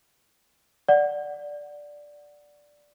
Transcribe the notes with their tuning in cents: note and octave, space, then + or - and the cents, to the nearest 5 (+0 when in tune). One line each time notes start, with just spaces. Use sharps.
D5 +0 F#5 +0